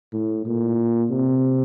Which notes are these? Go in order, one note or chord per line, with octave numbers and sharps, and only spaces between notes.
A2
A#2
C3